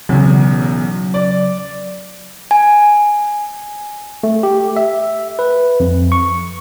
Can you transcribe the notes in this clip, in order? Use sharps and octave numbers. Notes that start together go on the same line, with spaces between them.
B1 E2 C#3 F#3
D5
G#5
A3
G4
E5
B4
F2
C#6